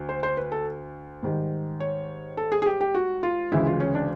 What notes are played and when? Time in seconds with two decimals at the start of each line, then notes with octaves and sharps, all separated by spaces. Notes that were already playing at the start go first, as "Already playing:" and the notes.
Already playing: D2
0.09 C5
0.23 C5
0.37 B4
0.52 A4
1.23 G#2 D#3 G3
1.80 C#5
2.37 A4
2.52 G#4
2.62 G#4
2.66 G4
2.81 G4
2.95 F#4
3.23 F4
3.52 D2 C#3 E3 G#3 E4
3.67 F4
3.80 C#4
3.95 D4